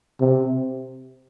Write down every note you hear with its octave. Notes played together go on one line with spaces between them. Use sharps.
C3